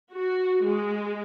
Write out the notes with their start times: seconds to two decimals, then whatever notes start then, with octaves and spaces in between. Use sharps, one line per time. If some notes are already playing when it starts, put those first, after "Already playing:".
0.13 F#4
0.64 G#3